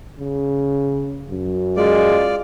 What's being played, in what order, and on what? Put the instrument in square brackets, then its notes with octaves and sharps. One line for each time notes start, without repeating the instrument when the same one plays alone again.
[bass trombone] C#3
F#2
[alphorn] G#3 [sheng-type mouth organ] F4 D5